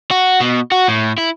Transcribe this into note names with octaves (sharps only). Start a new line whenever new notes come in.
F#4
B2
F#4
A2
E4